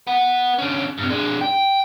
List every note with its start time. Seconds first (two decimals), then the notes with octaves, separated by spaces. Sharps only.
0.07 B4 F#5
0.58 D3 C#4
0.98 G2 C3
1.10 G#3 D4
1.41 G5